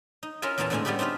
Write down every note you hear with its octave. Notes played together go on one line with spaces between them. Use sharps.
D#4
C#4 E4 F4 A#4 E5 G#5
E2 A#2 E3 A#3 C#4 A5
A2 D3 G#3 C4 C#4 G#5
G3 B3 C#4 E4 G4 G#4
C4 D4 D#4 F4 B4